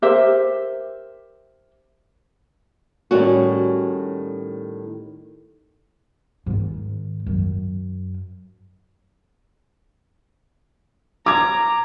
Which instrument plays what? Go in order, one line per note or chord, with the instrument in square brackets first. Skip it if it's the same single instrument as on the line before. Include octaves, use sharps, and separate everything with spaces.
[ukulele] G4 A#4 C5 E5
[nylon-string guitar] A2 D#3 G3 C#4 F#4
[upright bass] G#2 D#3
F#2
[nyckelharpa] A#5 [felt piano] D6 G#6